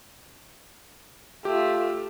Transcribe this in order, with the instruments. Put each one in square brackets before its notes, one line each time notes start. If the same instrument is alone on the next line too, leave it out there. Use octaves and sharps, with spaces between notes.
[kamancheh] A3 [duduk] F4 [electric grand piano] G4